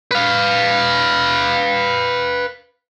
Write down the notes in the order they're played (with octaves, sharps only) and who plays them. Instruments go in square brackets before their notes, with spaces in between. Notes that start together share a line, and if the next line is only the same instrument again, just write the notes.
[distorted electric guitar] B4 F5